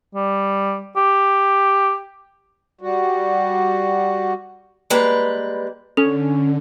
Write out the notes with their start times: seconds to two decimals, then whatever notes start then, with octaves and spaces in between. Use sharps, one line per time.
0.15 G3
0.96 G4
2.81 G3 F#4
4.90 G3 G#3 A#3 B4
5.97 D3 C#4 A4